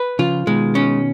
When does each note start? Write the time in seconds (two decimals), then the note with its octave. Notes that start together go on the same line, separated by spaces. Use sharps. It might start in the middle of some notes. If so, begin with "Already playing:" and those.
Already playing: B4
0.19 C#3 F3 F4
0.47 B2 D#3 G#3
0.75 C#4